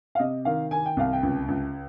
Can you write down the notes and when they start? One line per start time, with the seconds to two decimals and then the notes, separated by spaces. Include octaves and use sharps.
0.15 F5
0.19 C3 D#5
0.45 D#3 F5
0.71 D#3 G#5
0.86 G5
0.97 C2 F5
1.13 G5
1.23 C#2
1.48 C#2